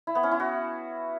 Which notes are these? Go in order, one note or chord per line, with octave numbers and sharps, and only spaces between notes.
E4
B3
C#4
E4
F#4